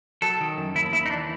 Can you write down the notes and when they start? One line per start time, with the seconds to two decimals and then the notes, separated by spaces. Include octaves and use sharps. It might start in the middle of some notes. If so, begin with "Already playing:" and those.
0.22 F#3 A4
0.41 D#3
0.57 F#2
0.75 D#2 E4
0.93 D#2 E4
1.06 D#4
1.10 E3 D4